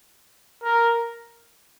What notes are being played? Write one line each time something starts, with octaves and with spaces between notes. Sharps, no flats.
A#4